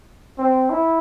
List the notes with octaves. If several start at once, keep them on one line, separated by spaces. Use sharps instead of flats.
C4
E4